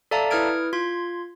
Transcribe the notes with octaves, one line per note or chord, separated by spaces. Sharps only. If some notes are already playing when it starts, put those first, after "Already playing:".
A4 D5 E5 F5 A5 A#5
E4 B4 D#6 F6 G#6 D7
F4 C6 G#6